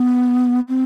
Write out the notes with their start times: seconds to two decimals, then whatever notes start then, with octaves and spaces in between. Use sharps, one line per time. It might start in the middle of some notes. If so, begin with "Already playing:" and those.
Already playing: B3
0.69 C4